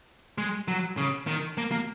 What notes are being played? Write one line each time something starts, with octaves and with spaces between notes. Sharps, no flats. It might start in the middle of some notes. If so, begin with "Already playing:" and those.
G#3
F#3
C#3
D#3
A#3
A#3